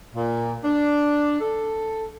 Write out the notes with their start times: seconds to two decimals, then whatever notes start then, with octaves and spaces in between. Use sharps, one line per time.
0.16 A#2
0.64 D4
1.41 A4